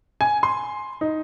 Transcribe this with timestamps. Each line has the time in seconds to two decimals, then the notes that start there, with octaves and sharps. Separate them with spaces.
0.21 G#5
0.43 C6
1.01 D#4